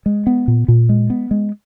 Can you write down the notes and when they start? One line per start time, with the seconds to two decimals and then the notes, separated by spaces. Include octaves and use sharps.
0.06 G#3
0.27 B3
0.48 A#2
0.68 A#2
0.89 G#3
1.10 B3
1.31 G#3